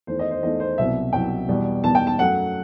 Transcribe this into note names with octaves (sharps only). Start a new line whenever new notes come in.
E2 D#3 A3 C5
D#5
C5
E2 D#3 A3 D#5
C5
C2 B2 F#3 E5
C2 B2 F#3 G5
E2 B2 G3
E2 B2 G3 A5
G5
A5
F#2 F#3 A3 F#5